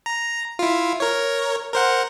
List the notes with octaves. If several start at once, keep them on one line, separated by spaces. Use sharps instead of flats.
A#5
E4 F4
A#4 C#5
A#4 C5 F#5